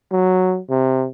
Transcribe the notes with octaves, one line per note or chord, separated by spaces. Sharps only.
F#3
C3